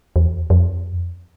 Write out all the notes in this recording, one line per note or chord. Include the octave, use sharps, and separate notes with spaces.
E2
F2